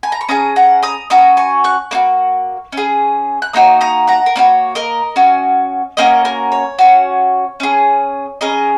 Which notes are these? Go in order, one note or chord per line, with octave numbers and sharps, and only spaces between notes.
G#5
A#5
C#6
C#4 G#4 A#5 D#6
F#5 A#5
A#5 D#6
C#4 F#4 A#5 D#6
G#5 C#6
C#6 F#6
A#3 D#4 F#4
C#4 G#4
F#6
A#3 D#4 F#4 A#5 D#6
A#5 D#6
F#5 A#5
A#4
A#3 D#4 F#4 C#5
A#4 D#5
C#4 F#4
A#3 C#4 F#4 A#4 D#5
A#4
C#5
C#4 F#4
C#4 G#4
C#4 G#4 A#4 D#5